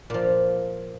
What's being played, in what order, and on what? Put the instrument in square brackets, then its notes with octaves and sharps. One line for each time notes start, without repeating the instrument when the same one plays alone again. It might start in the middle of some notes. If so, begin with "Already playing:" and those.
[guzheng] A#2 F3